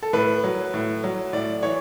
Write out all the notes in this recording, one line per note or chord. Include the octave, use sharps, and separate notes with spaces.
A4
A2 B4
F#3
A2
F#3
A2 D5
E3 C#5